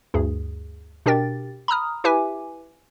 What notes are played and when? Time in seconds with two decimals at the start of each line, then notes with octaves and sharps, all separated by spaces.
0.14 D2 G2 G#4
1.06 B2 D4 G4 A#4 G5 A6
1.68 A#5 B5 D#6 F6
2.04 E4 G4 B4 E5 G#5 D6